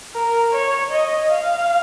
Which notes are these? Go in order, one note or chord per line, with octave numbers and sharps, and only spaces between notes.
A#4
C#5
D#5
F5